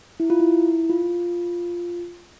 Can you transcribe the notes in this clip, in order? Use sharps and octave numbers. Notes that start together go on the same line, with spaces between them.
E4
F4
E4
F4